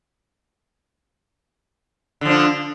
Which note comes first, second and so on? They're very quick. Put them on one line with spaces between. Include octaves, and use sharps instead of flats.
D3 F3 D4